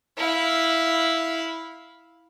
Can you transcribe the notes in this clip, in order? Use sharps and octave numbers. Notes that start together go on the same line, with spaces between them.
E4 F5